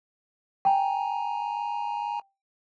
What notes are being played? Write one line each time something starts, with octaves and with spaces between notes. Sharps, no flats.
G5 G#5 A#5